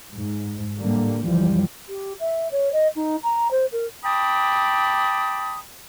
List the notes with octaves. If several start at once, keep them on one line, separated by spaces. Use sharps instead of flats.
G#2
A2 D3 G3 A#3
C#2 F#2 E3 F3 G3
G4
E5
C#5
D#5
D#4
A#5
C5
A#4
G5 A5 B5 D6 D#6